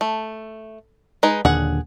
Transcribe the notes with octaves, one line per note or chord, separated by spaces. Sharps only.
A3
G#3 D#4 B4
D#1 D#2 D3 G#4 F#5